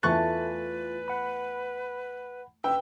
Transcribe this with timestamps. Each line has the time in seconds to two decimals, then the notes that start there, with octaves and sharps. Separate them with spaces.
0.03 E2 A3 F4 B4 C#6 F#6 A6
1.08 F#5 B5
2.64 B4 G5 E6